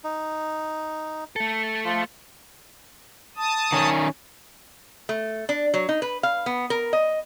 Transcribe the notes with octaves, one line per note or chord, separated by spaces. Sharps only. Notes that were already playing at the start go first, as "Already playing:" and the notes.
D#4
A3 A4
F3 F4
A5 D#6
D#3 C#4
A3
D4
F#3
D#4
B4
F5
B3
A#4
D#5